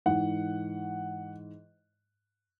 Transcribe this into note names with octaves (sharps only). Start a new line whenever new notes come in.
G#2 E3 F#5